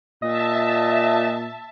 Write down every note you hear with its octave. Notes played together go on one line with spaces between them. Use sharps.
A#2 D#5 E5 A5